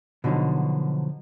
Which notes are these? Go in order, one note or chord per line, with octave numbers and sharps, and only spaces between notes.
B2 D3 F3 F#3 D#4